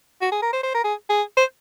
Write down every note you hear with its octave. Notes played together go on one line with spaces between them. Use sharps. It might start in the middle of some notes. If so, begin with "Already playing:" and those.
F#4
G#4
A#4
C5
C5
A#4
G#4
G#4
C5